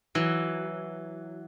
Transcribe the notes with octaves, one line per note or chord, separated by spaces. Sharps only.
E3 F#3